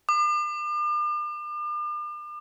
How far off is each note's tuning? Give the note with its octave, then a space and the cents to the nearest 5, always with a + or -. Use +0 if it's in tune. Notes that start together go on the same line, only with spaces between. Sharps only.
D6 +40